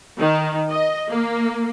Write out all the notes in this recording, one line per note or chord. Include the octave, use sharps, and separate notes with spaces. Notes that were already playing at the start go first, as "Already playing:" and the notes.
D#3
D#5
A#3